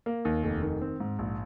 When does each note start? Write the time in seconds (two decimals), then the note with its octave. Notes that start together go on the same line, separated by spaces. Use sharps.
0.06 A#3
0.25 D#2
0.43 F1
0.62 D#3
0.81 C4
1.00 G#2
1.19 A#1